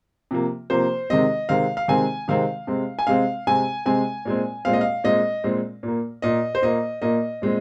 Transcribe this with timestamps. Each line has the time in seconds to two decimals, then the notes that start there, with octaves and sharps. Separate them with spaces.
0.31 C3 F3 A#3
0.70 C3 F3 A#3 C5
1.10 C3 D#3 G#3 C4 D#5
1.49 C3 D#3 G#3 C4 F5
1.77 F5
1.88 C3 D#3 G#3 C4 G#5
2.28 C3 D#3 G#3 C4 F5
2.67 C3 G#3 C4
2.99 G#5
3.07 C3 G#3 C4 F5
3.47 C3 G#3 C4 G#5
3.86 C3 G#3 C4 G#5
4.25 A#2 G#3 C4
4.65 A#2 G#3 C4 F5
4.73 D#5
4.81 F5
5.04 A#2 G#3 C4 D#5
5.44 A#2 G#3 C4
5.83 A#2 A#3
6.22 A#2 A#3 D#5
6.55 C5
6.62 A#2 A#3 D#5
7.02 A#2 A#3 D#5
7.42 A#2 G#3 C4